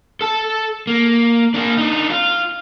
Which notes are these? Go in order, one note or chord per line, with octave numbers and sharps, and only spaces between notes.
A4 A5
A#3
A#3 D4
D4 D#4
F4